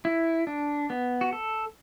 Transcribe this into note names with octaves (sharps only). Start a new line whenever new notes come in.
E4
D4
B3
F#4
A4